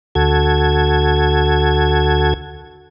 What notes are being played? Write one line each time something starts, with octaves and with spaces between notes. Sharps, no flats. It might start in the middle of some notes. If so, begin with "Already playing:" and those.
D2 F#4 A4 G#6